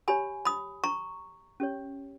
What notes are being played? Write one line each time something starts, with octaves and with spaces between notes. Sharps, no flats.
G4 C#5 G#5 B5
B5 D#6
A#5 C#6
C#4 G4 C#5